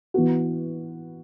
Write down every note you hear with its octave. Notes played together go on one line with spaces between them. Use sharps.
E3 B3 F#4